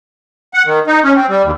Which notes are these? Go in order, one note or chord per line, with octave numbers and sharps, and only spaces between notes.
F#5
D#3
D#4
C#4
C4
G3
D#2